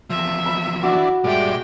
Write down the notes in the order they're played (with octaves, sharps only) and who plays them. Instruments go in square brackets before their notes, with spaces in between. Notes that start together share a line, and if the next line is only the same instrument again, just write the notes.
[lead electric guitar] E2 F3 [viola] E5
[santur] B5
[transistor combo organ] E3 D4 [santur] F#4
[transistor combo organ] G2 D5 [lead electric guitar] A#2 E5 [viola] G#3 G5